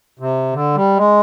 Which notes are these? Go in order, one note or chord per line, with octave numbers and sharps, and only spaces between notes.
C3
D3
G3
G#3